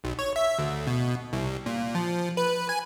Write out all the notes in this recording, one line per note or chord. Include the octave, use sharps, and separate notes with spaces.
B1
C#5
E5
D2
B2
C2
A#2
F3
B4
G#5